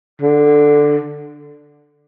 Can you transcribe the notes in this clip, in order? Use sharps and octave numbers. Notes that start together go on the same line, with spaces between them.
D3